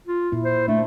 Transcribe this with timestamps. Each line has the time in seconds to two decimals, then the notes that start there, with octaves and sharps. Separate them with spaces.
0.07 F4
0.32 A#2 E4
0.45 C5
0.68 A3 D4